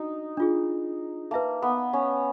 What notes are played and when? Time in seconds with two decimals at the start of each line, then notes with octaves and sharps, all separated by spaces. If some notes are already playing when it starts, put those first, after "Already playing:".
Already playing: D4 D#4 F#4
0.37 D4 F4 G#4
1.31 A#3 B4 E5 A5
1.62 B3
1.93 C#4